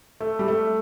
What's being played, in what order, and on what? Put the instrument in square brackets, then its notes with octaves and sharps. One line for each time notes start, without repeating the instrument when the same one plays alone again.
[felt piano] A3
G3
A3